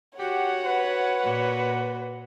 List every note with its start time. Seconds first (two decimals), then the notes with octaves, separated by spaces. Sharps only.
0.19 F#4 G4 C#5 F#5
0.66 B4
1.22 A#2 F#4